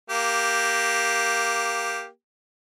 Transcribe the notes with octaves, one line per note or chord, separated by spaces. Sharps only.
A#3 G4